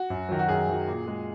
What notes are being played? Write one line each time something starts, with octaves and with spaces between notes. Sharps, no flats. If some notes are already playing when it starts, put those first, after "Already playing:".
Already playing: F#4
F#2
D#3 F#3
F#4
F#2 G#4
D#3 F#3
A#2
G#3